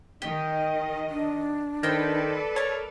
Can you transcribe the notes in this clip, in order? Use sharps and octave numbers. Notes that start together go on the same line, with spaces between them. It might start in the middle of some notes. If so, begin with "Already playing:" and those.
D#3 G4 D#5 G5
D4
D#3 A4 B4 C5 D5 G5
A#4 C#5 A5